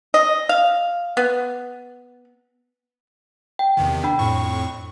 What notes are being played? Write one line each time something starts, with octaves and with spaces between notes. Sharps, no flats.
D#5
F5
B3
G5
E2 C3 D#3
D4 G5 B5
F2 A2 C#6